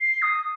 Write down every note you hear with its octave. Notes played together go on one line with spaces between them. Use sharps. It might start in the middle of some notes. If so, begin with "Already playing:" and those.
C7
D#6